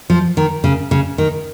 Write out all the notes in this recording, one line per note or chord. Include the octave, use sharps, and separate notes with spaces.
F3
D#3
C#3
C#3
D#3